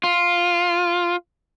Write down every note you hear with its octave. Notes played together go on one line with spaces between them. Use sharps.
F4